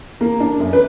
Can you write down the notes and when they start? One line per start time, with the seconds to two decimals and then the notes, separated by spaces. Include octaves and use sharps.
0.21 A#3
0.40 D4
0.60 F#2
0.73 B4